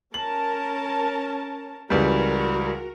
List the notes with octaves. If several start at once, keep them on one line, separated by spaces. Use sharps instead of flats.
C#4 A#4 A5 F#7
C#2 E3 G3 F#4 A#4